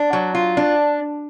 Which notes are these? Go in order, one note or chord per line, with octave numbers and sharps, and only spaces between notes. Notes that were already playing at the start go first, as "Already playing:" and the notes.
Already playing: D4
F#3
F4
D4